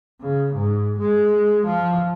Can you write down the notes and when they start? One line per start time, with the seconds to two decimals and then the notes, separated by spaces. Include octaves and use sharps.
0.20 C#3
0.54 G#2
0.99 G#3
1.66 F3